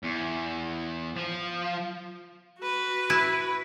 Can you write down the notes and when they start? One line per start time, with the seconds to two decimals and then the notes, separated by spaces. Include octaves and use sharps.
0.03 E2
1.17 F3
2.59 F#4 B4
3.10 E4